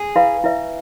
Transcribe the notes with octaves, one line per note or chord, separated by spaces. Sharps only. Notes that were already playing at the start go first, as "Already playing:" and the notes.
Already playing: G#4
E4 B4 F5 B5
E4 B4 E5